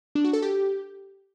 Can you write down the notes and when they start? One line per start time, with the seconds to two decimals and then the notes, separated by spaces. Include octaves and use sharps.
0.15 D4
0.24 F#4
0.33 A4
0.42 G4